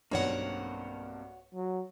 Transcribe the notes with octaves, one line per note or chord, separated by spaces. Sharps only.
B1 G2 A#3 C4 F#4 C#5 F#5
F#3